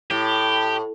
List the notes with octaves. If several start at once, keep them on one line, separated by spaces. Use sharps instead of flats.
A2 G4